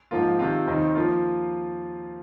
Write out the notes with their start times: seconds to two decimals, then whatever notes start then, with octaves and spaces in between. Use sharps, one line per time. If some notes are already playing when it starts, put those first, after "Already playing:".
0.11 G#2 F3 A#3 F4
0.39 C3 D#3 C4 F4
0.67 D#2 D#3 C4 D#4
0.95 F3 A#3 F4